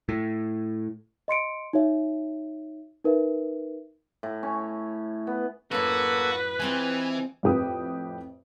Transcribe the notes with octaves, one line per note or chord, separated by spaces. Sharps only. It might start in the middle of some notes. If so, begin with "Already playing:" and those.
A2
D#5 C6 C#7 D7
D#4 F#4 C#5 E5
D#4 A#4 B4 E5
A2
C#4
B3
F#2 A2 A#3 F#4 A4 B4
E3 G#3 C4 F4 G#5
F2 A2 C4 G4 B4 D#6